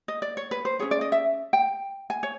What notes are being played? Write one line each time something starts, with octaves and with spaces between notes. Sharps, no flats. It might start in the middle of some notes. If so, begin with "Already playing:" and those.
D#5
D5
C#5
B4
C5
C#4 E4 G#4 C#5
D5
D#5
E5
G5
G#5
C#5